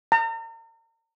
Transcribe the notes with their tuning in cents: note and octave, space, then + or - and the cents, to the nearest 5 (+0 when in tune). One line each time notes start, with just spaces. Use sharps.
A#5 -40